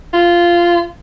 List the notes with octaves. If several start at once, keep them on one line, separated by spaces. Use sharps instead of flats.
F4